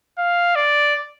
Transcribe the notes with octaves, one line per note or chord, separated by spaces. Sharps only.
F5
D5